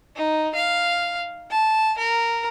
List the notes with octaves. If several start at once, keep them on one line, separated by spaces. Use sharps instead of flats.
D#4
F5
A5
A#4